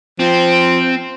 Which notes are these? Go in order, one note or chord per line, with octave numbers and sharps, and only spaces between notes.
F3 C4